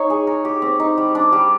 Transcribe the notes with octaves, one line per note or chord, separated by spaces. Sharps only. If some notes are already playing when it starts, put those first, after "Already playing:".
Already playing: D#4 C#5
G#4
A#4
G4
C4
D#4
G3
D4
G3